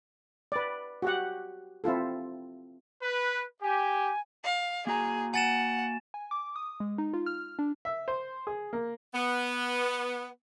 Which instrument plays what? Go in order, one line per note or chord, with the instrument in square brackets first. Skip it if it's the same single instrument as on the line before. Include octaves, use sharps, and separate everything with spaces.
[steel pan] B4 D5
F#4 G4 F#5
C4 E4 F4 A4
[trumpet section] B4
[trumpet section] G4 [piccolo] G#5
[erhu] F5
[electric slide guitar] A#3 F#4 A#5 [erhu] G#4
[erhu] F#5 [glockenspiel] G#5 A6 E7
[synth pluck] G#5
D6
D#6
G#3
D#4
F4
F6
D4
[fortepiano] E5
C5
G#4
A#3
[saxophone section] B3